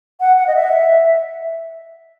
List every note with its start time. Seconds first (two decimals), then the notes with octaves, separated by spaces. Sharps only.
0.20 F#5
0.38 F#5
0.47 D#5
0.56 E5